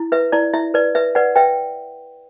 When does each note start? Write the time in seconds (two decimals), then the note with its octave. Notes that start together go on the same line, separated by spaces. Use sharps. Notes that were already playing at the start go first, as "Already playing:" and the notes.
Already playing: E4
0.12 B4 E5
0.32 E4 D5
0.53 E4 E5
0.74 B4 D5
0.95 B4 E5
1.15 B4 D5 F#5
1.36 B4 E5 G5